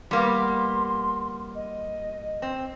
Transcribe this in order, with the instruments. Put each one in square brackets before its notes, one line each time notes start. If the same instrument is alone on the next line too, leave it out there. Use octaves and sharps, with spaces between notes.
[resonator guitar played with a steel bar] G3 A#3 B3 [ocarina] C6
[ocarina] D#5
[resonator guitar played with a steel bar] C4